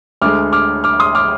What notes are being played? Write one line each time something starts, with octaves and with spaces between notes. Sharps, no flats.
D2 D3 G#3 D6 F6
D6 F6
D6 F6
C6 D#6
D6 F6